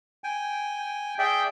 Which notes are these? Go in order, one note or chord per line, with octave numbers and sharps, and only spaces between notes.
G5 G#5
G#4 D5 E5 G5